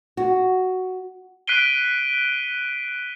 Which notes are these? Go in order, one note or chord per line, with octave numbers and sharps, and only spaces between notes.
F#4
F#6 B6 C7 D7 D#7 G7